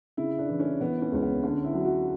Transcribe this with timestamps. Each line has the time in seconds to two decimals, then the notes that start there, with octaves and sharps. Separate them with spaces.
0.17 C#3 E4
0.38 D4
0.49 E3
0.59 C#4
0.80 E3 B3
1.02 C#4
1.12 C#2 C#4
1.22 B3
1.43 D3 C#4
1.64 E4
1.75 F#3
1.85 F#4